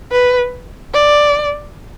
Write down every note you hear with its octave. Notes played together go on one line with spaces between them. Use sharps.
B4
D5